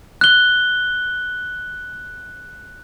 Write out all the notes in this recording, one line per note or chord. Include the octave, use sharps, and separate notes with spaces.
F#6 G7